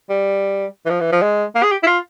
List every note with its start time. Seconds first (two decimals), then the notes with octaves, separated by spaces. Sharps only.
0.09 G3
0.85 E3
0.90 F3
1.01 E3
1.12 F3
1.22 G#3
1.55 A#3
1.63 G#4
1.71 G4
1.83 E4
1.87 F4